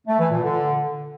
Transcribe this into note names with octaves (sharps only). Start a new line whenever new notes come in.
A3
E3
A#2
D3